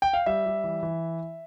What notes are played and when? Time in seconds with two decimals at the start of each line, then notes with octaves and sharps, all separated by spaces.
0.02 G5
0.13 F5
0.26 G3 E5
0.46 G3
0.64 E3
0.83 E3